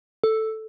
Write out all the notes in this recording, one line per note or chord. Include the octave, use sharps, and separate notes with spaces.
A4